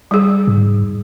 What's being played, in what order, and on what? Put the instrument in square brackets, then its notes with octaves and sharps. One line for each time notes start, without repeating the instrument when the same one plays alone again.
[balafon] G3 G#4
[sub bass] G#2